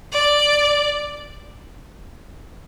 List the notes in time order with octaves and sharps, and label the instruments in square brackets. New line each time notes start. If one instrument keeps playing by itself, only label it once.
[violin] D5